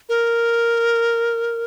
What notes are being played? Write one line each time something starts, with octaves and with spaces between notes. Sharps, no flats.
A#4